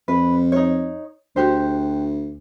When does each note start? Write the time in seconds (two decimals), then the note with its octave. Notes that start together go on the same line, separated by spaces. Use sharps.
0.08 F2 B4
0.52 D#4 C#5
1.36 D2 F#4 G4 C5